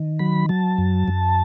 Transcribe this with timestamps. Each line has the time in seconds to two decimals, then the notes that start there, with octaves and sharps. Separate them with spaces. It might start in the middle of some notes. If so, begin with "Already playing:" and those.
Already playing: D#3
0.19 F#3 B5
0.49 F#3 A5
0.78 F#2
1.08 F#2